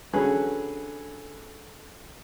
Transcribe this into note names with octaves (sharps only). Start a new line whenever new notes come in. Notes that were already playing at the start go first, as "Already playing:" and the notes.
D3 F#3 C#4 G#4 B4